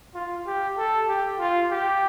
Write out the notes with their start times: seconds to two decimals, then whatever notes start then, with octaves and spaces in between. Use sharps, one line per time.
0.14 F4
0.46 G4
0.77 A4
1.08 G4
1.39 F4
1.71 G4